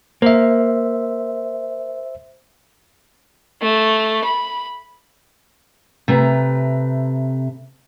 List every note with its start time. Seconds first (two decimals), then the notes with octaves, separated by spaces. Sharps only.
0.22 A#3 C5 E5
3.62 A3
4.24 B5
6.08 C3 A3 B4 A#5